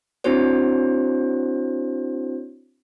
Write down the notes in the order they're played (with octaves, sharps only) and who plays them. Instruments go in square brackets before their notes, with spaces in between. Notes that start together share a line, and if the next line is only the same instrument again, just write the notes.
[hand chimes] C4 D4 E4 F#4 C5 C#5